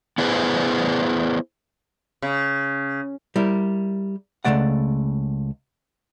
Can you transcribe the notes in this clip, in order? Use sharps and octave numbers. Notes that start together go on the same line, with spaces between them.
B3 E4 G#4 B4 C5
C#3
G3 E4 A#4
C#2 G2 C#3 A3 D5 F#5